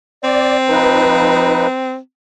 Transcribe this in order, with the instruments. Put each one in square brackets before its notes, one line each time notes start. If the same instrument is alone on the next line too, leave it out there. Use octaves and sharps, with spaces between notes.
[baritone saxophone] C4 [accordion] D5
[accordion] F3 D#4 B4